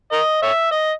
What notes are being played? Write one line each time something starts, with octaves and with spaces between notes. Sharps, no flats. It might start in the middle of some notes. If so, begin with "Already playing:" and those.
A#4 D#5
C#5 E5
D#5